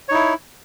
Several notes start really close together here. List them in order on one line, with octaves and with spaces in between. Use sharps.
C#5 D#4 E4